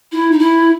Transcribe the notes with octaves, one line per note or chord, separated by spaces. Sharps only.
E4
D#4
E4